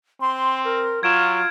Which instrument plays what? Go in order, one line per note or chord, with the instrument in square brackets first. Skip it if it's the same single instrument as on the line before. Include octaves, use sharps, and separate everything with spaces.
[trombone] C4 [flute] C6
[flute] A#4
[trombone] F#3 [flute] F4 [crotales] G#6 D7 E7